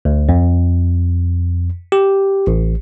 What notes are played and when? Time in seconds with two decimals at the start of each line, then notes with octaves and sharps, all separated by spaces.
0.05 D2
0.29 F2
1.92 G4
2.47 A1